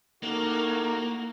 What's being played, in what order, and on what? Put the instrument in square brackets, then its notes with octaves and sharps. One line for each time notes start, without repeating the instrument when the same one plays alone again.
[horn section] A2 D#4 F#4 [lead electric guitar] A#3 [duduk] A#4